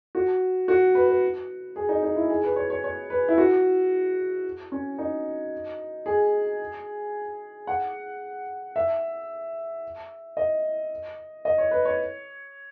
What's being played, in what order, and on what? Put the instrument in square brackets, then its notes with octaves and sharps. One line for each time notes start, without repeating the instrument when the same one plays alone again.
[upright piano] F#4
F#4
B4
B4
G#4
D#4
D#4
E4
G#4
B4
C#5
C#5
C#5
B4
E4
F#4
C#4
D#4
G#4
F#5
E5
D#5
D#5
C#5
B4
C#5